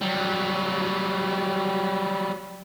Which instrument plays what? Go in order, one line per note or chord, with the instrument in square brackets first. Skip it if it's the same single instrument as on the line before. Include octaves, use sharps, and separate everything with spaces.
[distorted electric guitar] F#3 G3